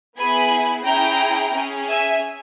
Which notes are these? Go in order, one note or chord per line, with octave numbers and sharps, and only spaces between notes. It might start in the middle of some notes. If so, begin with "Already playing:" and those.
B3 E4 G#4 G#5 B5
C#4 E4 G#4 G5 A#5
C#4 G#4
E5 G#5